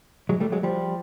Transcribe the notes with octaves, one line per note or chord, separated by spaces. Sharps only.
F#3 G#3
G3 A3
F#3 G#3
F3 G3